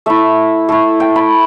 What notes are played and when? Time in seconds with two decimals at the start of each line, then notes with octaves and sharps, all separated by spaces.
0.06 A3 E4 E5
0.69 A3 E4
1.00 G5
1.16 B5